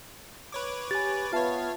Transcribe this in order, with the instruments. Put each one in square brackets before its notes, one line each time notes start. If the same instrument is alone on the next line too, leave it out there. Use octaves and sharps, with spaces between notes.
[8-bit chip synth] B4 C#5 D6
[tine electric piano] G4 G#5 [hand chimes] A6
[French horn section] B3 B4 [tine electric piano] F4 E5 A5 [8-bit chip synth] C#5 F5